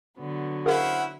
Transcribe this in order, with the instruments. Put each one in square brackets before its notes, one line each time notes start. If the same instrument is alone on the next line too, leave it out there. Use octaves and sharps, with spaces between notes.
[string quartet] D3 F#3 B3
[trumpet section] C#4 E4 C5 [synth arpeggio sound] G#4 A#4 F5 [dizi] F#5